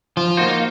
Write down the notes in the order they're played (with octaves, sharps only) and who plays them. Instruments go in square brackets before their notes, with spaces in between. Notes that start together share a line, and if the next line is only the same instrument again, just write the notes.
[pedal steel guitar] F3 [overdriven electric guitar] F4
[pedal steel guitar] A#3 D#4 F#4 C5